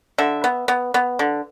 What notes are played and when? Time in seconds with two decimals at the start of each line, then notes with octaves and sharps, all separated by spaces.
0.18 D3 E5
0.44 B3
0.68 B3
0.94 B3
1.19 D3